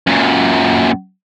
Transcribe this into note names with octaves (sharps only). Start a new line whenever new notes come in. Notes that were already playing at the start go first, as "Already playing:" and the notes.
F#2 A#2